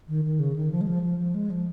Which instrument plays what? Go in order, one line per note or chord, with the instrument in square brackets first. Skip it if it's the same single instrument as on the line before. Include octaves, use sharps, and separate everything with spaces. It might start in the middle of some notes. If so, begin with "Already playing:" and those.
[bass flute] D#3
D#3
C#3
D#3
F3
G#3
F3
F3
F3
G#3
F3